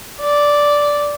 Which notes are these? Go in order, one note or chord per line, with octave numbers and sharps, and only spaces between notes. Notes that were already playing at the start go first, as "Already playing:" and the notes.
D5